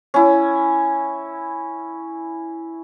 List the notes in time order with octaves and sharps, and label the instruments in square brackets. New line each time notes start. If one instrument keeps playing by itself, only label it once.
[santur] C#4 E4